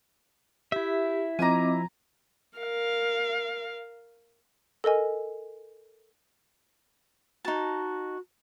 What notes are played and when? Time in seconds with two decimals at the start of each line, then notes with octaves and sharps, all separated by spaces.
0.72 E4 G4 E5
1.39 F3 C4 D#5 G#5 A#5 D6
2.58 A#4 F5
4.84 A4 A#4 D#5 G#5
7.45 D#4 F#4 A5